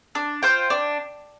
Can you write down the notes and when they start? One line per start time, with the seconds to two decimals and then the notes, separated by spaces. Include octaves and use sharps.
0.15 D4
0.43 F4 C5 G5
0.70 D4